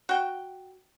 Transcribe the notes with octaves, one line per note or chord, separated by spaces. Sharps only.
F#4 G5